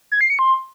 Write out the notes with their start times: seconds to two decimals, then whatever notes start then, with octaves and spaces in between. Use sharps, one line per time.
0.12 G#6
0.21 C7
0.30 C#7
0.39 C6